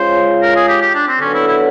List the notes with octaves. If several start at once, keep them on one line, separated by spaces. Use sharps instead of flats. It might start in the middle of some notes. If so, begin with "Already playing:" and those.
Already playing: G#3 C#4 F4 C5
A#4
G#4
G4
G4
D4
C4
D3 F#3 B3 C#4
E4
E4